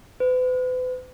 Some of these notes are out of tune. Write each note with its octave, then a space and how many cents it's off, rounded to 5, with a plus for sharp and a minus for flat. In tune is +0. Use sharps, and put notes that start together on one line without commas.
B4 +40